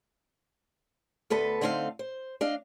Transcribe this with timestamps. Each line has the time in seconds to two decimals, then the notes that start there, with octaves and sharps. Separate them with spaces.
1.30 D2 B3 A4 B4
1.61 D3 A3 C4 D#4 E4 F5
1.99 C5
2.41 D4 D#5 F5